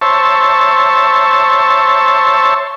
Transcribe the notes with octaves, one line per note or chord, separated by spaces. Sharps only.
C5 C#5 E5 A5